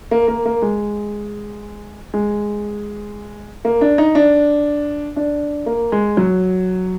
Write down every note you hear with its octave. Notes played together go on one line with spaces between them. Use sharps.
A#3
A#3
A#3
G#3
G#3
A#3
D4
D#4
D4
D4
A#3
G#3
F#3